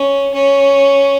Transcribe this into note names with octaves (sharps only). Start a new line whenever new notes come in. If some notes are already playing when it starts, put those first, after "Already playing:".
Already playing: C#4
C#4